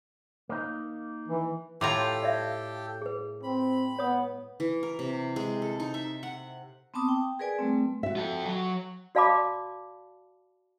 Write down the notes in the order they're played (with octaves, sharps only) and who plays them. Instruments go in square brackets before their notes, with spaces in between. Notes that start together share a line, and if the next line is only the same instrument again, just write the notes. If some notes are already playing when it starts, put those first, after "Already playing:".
[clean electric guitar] A#3 D#4
[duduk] E3
[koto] A2 F4 A#5 [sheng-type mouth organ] G4 A4 G5 [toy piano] G#5 D6
[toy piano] D5 E5 F5
G#4 B4
[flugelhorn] C4 [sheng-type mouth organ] B5
[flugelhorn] B3 [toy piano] C#5 D#6
[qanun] E3
A#4
C3
G#3
A4
D#4
E5
F#5
[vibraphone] B3 C4 A5 D6 D#6
G5
G#4 A#4 B4 D5 G#5
G3 A3 C4
[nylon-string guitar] F#4 E5
[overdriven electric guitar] F4 A4
F#3
[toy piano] F#4 D5 F5 A5 B5 D6